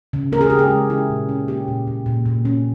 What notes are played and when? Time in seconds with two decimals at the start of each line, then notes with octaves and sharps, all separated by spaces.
0.13 C#3
0.32 C#4 A#4
0.41 G#4
0.50 C#3 G4
0.59 G#4
0.70 G#3
0.90 C#4 E4
1.10 A#2
1.29 C#4
1.48 A#3 G4
1.68 A#2
1.87 A#2
2.06 A#2
2.26 A#2
2.45 C#4